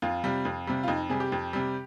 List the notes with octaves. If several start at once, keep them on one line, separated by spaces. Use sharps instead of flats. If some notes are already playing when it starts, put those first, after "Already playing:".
F2 F4
C3 G3
F2
C3 G3
F4
F2 D#4
C3 G3 G#4
G4
F2
C3 G3